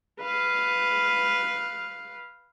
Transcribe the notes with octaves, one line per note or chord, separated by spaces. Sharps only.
B4 F5